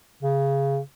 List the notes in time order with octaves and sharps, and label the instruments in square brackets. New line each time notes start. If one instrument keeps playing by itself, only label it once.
[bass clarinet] C#3